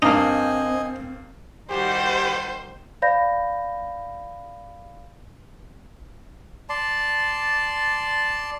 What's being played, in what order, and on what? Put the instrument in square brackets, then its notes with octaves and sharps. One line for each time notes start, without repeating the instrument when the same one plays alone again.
[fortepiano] G2 A#3 [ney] C4 [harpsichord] D#4 [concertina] D#5 G#5
[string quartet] D#3 G3 F#4 [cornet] G4 [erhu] C5
[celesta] C5 D5 F5 B5 G6 A#6
[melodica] D5 A5 C6